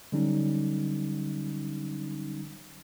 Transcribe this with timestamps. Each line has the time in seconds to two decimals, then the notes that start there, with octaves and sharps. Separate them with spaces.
0.12 D3 F#3 G3 C#4 D#4